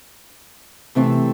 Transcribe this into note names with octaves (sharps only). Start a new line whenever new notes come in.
C3 E3 A3 C4